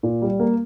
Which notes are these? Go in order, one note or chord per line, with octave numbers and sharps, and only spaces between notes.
A#2
G3
A#3